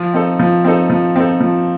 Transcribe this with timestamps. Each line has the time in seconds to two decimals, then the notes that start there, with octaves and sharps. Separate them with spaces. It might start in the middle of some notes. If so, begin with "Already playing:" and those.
Already playing: F3
0.14 C4 D#4 A4
0.40 F3
0.64 C4 D#4 A4
0.90 F3
1.16 C4 D#4 A4
1.40 F3